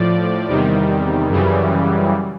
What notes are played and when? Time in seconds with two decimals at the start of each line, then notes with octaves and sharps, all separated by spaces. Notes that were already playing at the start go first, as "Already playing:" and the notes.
Already playing: A2 F3 D5
0.47 E2 C3 D#3 G3
1.29 F#2 C#3 E3 G3